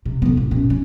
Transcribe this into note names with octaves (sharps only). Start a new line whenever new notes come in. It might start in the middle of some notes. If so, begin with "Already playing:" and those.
C3
D3 B3
A1
F#2 B2
C#4